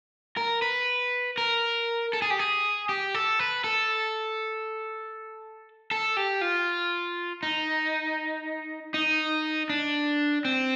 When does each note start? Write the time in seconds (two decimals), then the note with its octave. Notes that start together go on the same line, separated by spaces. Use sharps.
0.37 A#4
0.62 B4
1.38 A#4
2.13 A4
2.22 G#4
2.30 G4
2.39 G#4
2.89 G4
3.15 A4
3.39 B4
3.64 A4
5.91 A4
6.17 G4
6.41 F4
7.43 D#4
8.94 D#4
9.70 D4
10.45 C4